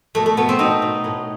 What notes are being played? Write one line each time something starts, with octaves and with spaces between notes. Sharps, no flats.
B2 A3
A3
B2 B3
C4
B2 D#4
B2
A2